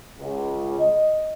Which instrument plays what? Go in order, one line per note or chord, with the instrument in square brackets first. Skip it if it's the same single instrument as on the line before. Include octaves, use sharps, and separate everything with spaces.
[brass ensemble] C#2
D#5